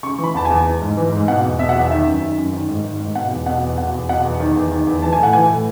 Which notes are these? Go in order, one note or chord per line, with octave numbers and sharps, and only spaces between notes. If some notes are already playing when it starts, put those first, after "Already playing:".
C#3 C#6
E3
B5
E2 A5
E2 G#5
E3
G#2
E3
G#2
B2 F#5
E2
B2 E5
F#5
E2 E5
D#3 E5
F#2
D#3
F#2
D#3
G#2
D#3
G#2
B2 F#5
E2
B2 F#5
E2
B2 F#5
E2
B2 F#5
E2
D#3
E2
D#3
E2
E3 A5
G#5
A2
F#5
E3 G#5
A2